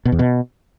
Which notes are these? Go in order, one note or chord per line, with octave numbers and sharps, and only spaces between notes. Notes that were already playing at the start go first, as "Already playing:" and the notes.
B2
E2
B2